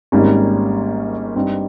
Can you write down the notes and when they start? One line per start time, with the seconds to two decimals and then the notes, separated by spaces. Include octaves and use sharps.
0.12 G#1 G#2 G3 A#3 C#4
1.35 G2 G3 C4 D#4